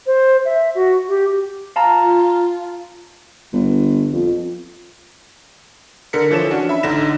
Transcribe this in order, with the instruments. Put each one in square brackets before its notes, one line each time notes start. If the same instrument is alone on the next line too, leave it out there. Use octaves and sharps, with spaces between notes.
[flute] C5
E5
F#4
G4
[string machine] F4 [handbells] F5 A5 A#5
[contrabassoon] G1
F2
[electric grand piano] D3 A#4 B6 C#7
E3 F3 A4 C#5 E7
C#4 D4 F#4
E5 B5
A1 D3 D#4 A#6 B6 E7